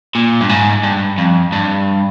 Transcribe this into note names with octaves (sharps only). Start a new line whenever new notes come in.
A#2
G2
G#2
G2
F2
G2